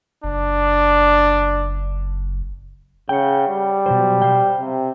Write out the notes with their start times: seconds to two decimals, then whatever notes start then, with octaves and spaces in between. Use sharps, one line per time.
0.24 F#1 D4
3.09 C#3 F#5 G5
3.48 G3
3.86 B2 F#3 C5
4.22 C5 F5 G5
4.59 C3